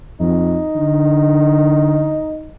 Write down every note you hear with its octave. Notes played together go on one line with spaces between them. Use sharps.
F2 D#4
D3